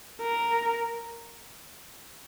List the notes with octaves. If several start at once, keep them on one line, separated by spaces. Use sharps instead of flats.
A#4